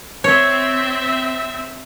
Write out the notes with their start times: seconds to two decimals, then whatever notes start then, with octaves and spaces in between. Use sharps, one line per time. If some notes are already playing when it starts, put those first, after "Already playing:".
0.24 C4 C#5 E5